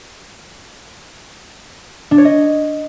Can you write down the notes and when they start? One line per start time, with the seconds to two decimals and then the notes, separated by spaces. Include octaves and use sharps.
2.11 D4
2.18 C#5
2.25 D#5